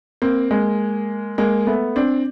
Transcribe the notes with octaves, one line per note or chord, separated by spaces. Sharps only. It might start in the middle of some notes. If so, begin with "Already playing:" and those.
A#3 C4
G#3 A#3
G#3 A#3
A3 B3
C4 D4